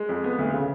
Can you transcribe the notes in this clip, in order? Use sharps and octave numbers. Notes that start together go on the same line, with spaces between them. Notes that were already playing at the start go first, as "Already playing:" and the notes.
Already playing: G#3
F2
B3
D2
C#3